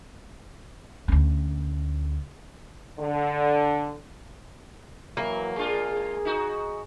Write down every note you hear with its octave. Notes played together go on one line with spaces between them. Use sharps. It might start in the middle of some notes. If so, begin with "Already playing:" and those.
D2 C#4
D3
E3 F#3 A#3
G#3 D4 F4 G#4
D#4 F#4